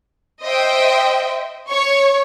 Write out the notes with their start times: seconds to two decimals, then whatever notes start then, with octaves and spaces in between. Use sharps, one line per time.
0.43 C5 D#5 E5 G5
1.69 C#5 C#6